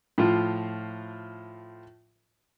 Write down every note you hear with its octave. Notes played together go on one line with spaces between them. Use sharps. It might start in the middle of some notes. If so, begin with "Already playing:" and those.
A2 F3 F4